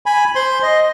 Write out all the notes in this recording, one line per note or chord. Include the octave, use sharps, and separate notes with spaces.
G#5 B5
C5 C6
D#5